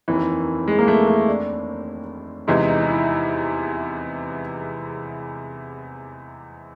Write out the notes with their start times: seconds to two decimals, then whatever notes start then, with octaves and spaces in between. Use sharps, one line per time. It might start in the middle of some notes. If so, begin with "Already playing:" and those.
0.08 F1 D#2 D#3 E3
0.68 G#3
0.79 A#3
0.88 A3
1.07 A3
1.28 D4
2.47 E2 C3 E3 G#3 D#4
2.68 D#4
2.82 D#4
2.88 E4